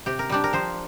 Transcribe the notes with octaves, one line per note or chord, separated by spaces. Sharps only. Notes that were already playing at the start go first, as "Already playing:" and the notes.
C3 G4
A#4
G3 D4 G4
A#4
F3 C5